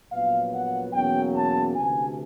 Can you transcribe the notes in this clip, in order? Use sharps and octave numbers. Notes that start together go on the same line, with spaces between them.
A#1 A#2 F#3 B3 F5
F#5
E2 B2 F#3 A#3 C#4 G5
A5
D2 C3 E3 G#5